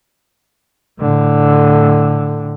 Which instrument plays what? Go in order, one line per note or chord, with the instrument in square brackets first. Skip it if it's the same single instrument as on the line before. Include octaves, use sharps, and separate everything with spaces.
[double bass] A2 D3